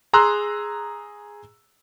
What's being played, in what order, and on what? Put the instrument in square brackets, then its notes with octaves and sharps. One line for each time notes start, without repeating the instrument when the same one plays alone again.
[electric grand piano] G#4 A#5 C6 E6 F#6